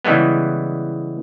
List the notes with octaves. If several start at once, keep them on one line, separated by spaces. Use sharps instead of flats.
C#3 E3 G3 G#3 B3